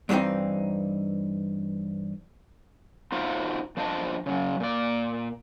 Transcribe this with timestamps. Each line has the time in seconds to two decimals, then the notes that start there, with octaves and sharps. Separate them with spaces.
0.09 G2 E3 A#3 C4 D#4
3.12 D#4 F4 F#4 C5 E5 F5
3.77 F3 D4 C5 D#5 A5
4.26 C#3 F#3
4.60 A#2 D5